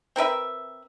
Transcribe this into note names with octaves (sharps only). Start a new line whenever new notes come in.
C4 A#4 B4 E5